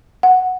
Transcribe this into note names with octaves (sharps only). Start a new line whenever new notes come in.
F#5